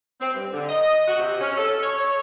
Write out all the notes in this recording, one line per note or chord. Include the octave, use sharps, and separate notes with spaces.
C4
G2
D3
D#5
F#4
C3
C#4
A4
C#5
C#5